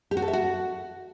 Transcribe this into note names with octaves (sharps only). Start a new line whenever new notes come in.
G4
F#4
A4
E5
F#4